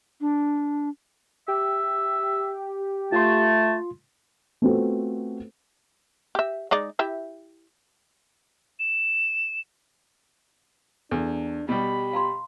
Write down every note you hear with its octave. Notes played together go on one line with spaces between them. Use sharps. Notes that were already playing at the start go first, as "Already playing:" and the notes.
D4
G4 E5
A3 F4 A5 C6
A3 B3 C4 F4 F#4 A4
G4 E5
G#3 D#4 D5
E4 G4 E5
E7
E2 D4 A4
B2 G3 G4 B5
F5 A#5 C6